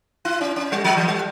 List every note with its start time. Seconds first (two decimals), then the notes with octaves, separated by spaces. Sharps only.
0.25 E4
0.41 C#4
0.56 C#4
0.72 G3
0.84 F3
0.97 E3
1.08 G3